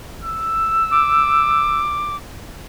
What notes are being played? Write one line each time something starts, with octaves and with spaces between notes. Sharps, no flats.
E6
D6